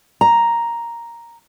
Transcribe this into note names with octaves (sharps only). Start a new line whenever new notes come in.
A#5